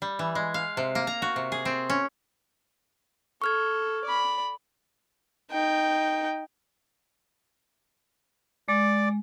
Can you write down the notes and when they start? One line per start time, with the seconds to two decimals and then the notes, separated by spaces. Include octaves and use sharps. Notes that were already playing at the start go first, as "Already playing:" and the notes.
0.02 G3
0.19 E3
0.35 G#3
0.54 F5
0.77 C3
0.95 A#3
1.07 A#5
1.22 F#4
1.36 C3
1.52 G#4
1.65 C4
1.90 C#4
3.42 A4 C#6 F6 G#6
4.04 D5 B5
5.51 D#4 G5
8.68 G#3 D5 D6